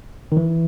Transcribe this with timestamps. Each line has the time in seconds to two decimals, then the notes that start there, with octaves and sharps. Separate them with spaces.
0.32 D#3
0.37 E3